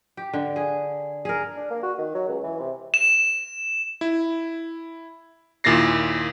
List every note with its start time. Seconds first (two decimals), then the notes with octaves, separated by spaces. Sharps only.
0.17 G4
0.33 D3
0.56 G#4
1.25 G#4 A#4
1.57 D4
1.70 A#3
1.83 F#4
1.98 D#3
2.15 F#3
2.28 C#2
2.43 E3
2.60 C3
2.94 E7
4.01 E4
5.64 D#2 A#2 E4 A6 A#6 C7